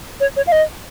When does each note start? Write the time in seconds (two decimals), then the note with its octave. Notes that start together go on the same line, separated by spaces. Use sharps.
0.20 C#5
0.36 C#5
0.47 F5
0.52 D#5